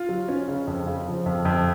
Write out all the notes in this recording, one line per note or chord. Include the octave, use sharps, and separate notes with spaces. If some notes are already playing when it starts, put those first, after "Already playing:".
Already playing: F4
F#3
C#4
C#3
F2
C#3
F3
F2
F2